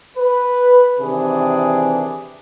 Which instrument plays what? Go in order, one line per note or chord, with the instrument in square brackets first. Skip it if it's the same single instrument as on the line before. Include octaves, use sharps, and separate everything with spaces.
[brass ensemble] B4
C3 D#3 E3 D4 G#4